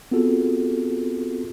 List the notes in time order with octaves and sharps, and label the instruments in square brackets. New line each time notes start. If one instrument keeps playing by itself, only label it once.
[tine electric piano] B3 C4 F4 F#4 G#4 A4